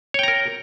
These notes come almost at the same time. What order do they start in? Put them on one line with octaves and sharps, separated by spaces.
C#5 G5 A#5 A#4